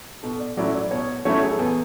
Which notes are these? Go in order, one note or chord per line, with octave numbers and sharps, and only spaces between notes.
B2 A4
D5
F#3 A3 C#4 E4 D5
D5
B2 C#5
F#3 A3 C#4 E4 C#5
G#4
A4
E2 B4